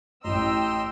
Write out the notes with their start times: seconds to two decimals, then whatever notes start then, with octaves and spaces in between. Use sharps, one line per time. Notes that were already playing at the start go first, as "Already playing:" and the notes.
0.24 A1 A2 D#5 G5 A#5 C6 E6